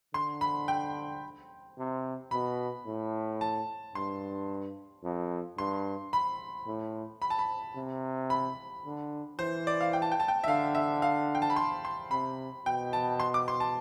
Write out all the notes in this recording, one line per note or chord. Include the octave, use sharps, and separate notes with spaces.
D3 C6
B5
G5
C3
B2 B5
A2
A5
G2 C6
F2
G2 C6
B5
A2
B5
A5
B5
C3
B5
D3
E3 C5
D5
F5
G5
A5
G5
A5
G5
E5
D3 F5
E5
F5
G5
A5
B5
C6
C6
C3 B5
B2 G5
A5
C6
D6
C6
A5